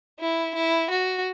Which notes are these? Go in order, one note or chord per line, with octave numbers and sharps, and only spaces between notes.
E4
E4
F#4